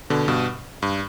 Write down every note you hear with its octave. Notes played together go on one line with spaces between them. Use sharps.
B2 D3
G2 B2
G2